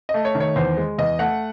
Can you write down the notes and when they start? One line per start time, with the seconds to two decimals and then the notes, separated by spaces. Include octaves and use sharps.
0.09 D#5
0.14 A3
0.25 C#5
0.35 D#3
0.40 C#5
0.56 E2 C5
0.77 G#3
0.98 E2 D#5
1.19 A3 F#5